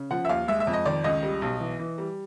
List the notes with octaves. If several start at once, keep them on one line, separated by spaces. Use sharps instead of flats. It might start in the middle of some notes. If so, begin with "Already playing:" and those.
Already playing: C#3
F3 F#5
E5
D#2 F5
G#3 E5
E5
F2
D#5
D#3 D5
C#2 D#5
G3
B1
E3
E3
G3